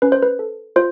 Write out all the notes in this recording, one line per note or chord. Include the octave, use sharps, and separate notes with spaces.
C#4 B4
C5
B4
A4
F4 C5